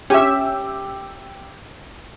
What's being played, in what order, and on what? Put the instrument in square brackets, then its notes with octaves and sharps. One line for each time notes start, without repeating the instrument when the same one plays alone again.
[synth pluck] C#4 E5 [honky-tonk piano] G4 D6 E6